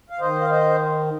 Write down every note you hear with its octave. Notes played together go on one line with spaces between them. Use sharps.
F5
D#3 C5 D#5
F5
C5 D#5